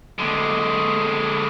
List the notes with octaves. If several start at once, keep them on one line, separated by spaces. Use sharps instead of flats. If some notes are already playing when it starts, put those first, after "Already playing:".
D3 G#3